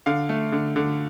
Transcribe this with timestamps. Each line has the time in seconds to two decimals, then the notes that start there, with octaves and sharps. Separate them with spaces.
0.06 D3 F5
0.29 A3
0.52 D3
0.76 D3